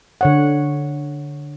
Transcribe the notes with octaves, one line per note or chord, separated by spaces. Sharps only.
D3 C#5 F#5